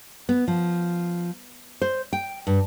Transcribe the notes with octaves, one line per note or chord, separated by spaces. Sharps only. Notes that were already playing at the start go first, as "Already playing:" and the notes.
B3
F3
C5
G5
G2